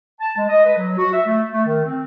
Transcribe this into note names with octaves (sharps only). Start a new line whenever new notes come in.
A5
G#3
D#5
B4
F#3
F#4
E5
A3
A3
D#3
C4